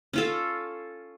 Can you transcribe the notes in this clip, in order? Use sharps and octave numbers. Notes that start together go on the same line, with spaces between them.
C#4 F4 A4